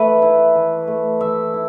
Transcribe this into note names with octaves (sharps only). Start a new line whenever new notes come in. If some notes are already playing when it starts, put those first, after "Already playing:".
Already playing: E3 A3 B4 E5
E4
E3
A3
E3 E5
E4